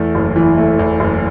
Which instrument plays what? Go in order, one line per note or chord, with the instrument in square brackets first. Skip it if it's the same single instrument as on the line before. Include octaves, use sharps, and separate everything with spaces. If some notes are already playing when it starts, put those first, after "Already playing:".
Already playing: [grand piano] E2 A3
F#1
E3
A3
E2
F#1